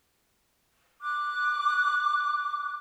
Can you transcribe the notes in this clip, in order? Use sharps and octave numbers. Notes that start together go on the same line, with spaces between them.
D6 F#6